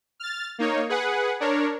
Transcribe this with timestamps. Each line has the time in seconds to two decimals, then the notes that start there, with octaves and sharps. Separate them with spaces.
0.20 F6 A6
0.58 A#3 D#4 C#5
0.89 G#4 B4 F#5
1.40 D4 A#4 C#5